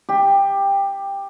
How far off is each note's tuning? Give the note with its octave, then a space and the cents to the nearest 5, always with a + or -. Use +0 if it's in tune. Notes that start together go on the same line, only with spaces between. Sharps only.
G4 +15